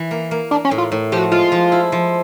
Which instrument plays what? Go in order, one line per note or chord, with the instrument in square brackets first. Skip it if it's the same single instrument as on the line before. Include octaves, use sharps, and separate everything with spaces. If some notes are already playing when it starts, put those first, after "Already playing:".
Already playing: [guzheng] E3
A#3
A#3
[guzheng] A#3 [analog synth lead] D4
[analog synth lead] C#4
[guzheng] A2
[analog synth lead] F4
[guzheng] A2
[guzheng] F3 [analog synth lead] G4
[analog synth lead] F#4
[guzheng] G#3 [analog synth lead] F4
[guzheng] F3
E4
F3